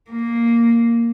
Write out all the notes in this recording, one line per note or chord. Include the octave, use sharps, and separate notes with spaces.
A#3